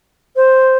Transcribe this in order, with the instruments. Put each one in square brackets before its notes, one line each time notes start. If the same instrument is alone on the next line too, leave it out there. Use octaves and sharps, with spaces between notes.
[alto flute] C5